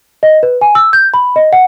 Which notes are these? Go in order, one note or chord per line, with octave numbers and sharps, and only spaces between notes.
D#5
B4
G#5
E6
G6
B5
D#5
F#5